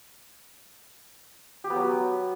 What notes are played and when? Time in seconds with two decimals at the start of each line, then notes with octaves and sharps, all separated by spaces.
1.64 G4
1.70 B3
1.76 F#3